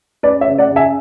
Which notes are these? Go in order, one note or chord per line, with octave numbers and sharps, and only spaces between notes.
C#4 B4 D5
C#5 E5
C#3
D5 F#5
C#3
E5 G#5